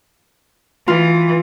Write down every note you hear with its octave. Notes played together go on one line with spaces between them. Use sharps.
E3 F4